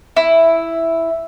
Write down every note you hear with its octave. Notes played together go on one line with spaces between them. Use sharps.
E4